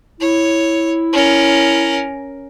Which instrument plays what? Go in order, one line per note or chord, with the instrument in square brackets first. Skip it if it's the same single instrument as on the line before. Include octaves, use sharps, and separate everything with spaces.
[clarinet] E4 [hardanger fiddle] C#5
[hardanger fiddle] C#4 A#4